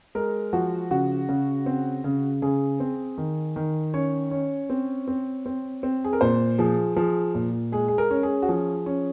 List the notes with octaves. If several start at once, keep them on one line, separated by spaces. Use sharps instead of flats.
G#3 A#4
F3 F#4
C#3 F#4
C#3
C4
C#3
C#3 G#4
C4
D#3
D#3
C#4 C#5
C#4
C4
C4
C4
C4
G#4
A#4
A#2 C5
F3 G#4
F3 G#4
A#2
G#3 G#4
G#4
A#4
C#4
G#4
F#4
F3 G#4
C#4